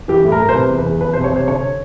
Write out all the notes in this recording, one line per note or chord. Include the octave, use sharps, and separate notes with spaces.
E3 G4
A2
A#4
A2
C5
C3 B4
E2
B4
E2
E2 B4
C3 C5
C#5
C3 C5
D3 C#5